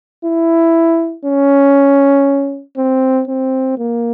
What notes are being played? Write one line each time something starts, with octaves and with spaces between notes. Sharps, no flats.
E4
C#4
C4
C4
A#3